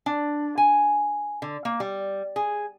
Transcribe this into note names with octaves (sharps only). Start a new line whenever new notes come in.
D4
G#5
D3
A#3
G3
G#4